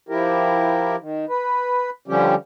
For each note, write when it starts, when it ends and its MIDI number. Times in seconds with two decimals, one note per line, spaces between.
0.09 0.96 53
0.09 0.96 64
0.09 0.96 67
0.09 0.96 70
1.00 1.25 51
1.29 1.90 71
2.08 2.35 50
2.08 2.35 53
2.08 2.35 55
2.08 2.35 61
2.08 2.35 67